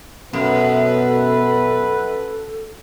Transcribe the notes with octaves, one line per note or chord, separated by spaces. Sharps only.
F#2 B2 A4 B4